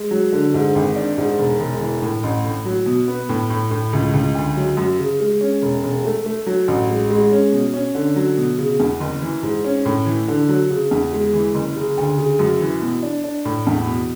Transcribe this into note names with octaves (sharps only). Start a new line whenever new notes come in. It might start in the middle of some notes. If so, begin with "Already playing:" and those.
Already playing: G#3
F#3
D3
G#2
G#1
D4
G#2
E1
E1
E3
A2
A1
A2
F#3
B2
B3
A2
A2
A2
C#2
C#2
D2
F#3
F#2
C#3
G#3
C#4
E1
E1
A3
A3
F#3
A1
G#3
G#3
C#4
B2
C#4
D3
F#3
B2
C#3
E2
F#1
E3
G#2
C#4
A2
E3
D3
F#3
C#3
E2
G#3
E3
F#1
C#3
D2
C#3
F#2
E3
B2
D4
D4
A2
E2
B2